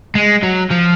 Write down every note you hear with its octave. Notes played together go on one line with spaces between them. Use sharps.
G#3
F#3
F3